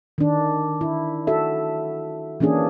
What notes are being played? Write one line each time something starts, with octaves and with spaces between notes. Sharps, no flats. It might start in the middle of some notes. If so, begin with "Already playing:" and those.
D#3 D4
E4
F#4 A4 E5
E3 A#3 C#4 D4 G#4